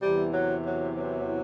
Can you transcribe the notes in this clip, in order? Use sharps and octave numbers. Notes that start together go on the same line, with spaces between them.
E2 C3 E3 G3
F#3
F#3
F#3